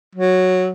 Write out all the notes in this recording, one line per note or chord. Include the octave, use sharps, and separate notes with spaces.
F#3